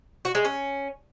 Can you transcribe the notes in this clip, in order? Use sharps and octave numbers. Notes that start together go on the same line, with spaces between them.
F#4
G#3
C#4